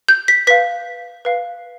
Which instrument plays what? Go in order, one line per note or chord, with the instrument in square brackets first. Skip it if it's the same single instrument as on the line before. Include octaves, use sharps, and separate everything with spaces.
[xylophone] G6
B6
B4 F5 B6
B4 F5